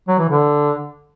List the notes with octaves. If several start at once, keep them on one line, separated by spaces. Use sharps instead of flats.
F#3
E3
D3